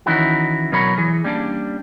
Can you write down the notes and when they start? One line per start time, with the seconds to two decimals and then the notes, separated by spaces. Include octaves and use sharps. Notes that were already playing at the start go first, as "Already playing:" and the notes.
0.06 D#3 E3 C#4 D#4 E4 F#4
0.72 B2 F#3 A#4 C#5 B5
0.98 E3 G#4
1.24 G3 A#3 C#4 D4